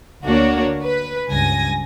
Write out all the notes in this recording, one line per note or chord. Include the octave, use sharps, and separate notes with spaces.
D2 A#3 D4 F#4 C#5
B4
C#2 G2 G#5 A#6